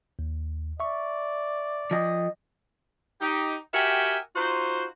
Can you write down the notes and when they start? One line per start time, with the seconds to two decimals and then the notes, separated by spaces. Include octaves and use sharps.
0.19 D#2
0.80 D5 E5 C#6
1.91 F3 D#5
3.21 D#4 G4
3.74 F#4 G4 A#4 E5 G5 G#5
4.35 D#4 F4 F#4 C5